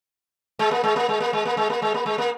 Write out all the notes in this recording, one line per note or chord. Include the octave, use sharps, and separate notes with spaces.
G#3
A#3
G#3
A#3
G#3
A#3
G#3
A#3
G#3
A#3
G#3
A#3
G#3
A#3